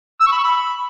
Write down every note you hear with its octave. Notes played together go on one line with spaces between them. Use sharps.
E6
C#6
B5
C#6
B5